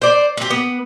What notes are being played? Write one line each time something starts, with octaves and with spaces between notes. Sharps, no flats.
C5 D5
C4 G4
B3